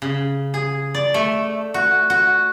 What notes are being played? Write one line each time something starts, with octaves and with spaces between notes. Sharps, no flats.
C#3
G#4
D5
A3
F#4
F#4